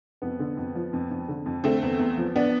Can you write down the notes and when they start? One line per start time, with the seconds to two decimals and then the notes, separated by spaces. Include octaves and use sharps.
0.22 F2 B3
0.39 D3
0.57 F2
0.75 F3
0.93 F2
1.11 F2
1.28 D3
1.46 F2
1.64 D3 A3 C4
1.82 E2
1.99 E2
2.18 F3
2.36 B3 D4